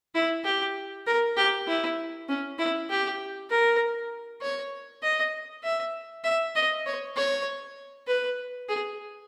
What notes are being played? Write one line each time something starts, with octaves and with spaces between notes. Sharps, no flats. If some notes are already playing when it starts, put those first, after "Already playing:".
E4
G4
A#4
G4
E4
C#4
E4
G4
A#4
C#5
D#5
E5
E5
D#5
C#5
C#5
B4
G#4